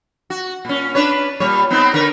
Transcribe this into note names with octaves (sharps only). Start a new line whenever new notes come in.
F#4
A#2 C#4
D4 B4 C#5
A#2 G3 C#5
B3 C4 D#4
D3 A#4 B4